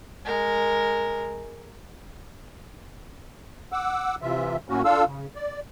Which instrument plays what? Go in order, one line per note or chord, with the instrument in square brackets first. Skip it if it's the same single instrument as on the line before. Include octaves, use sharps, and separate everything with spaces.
[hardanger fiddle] G#3 A#4
[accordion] F#5 D6 E6
C3 E3 F4 E5
A2 F#3 A#3 C#4 F#4
D4 F4 A4 F5 E6
C#3
D5